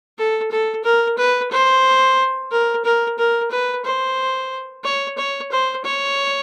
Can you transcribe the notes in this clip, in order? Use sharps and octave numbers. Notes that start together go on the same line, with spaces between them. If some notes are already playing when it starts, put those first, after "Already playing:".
A4
A4
A#4
B4
C5
A#4
A#4
A#4
B4
C5
C#5
C#5
C5
C#5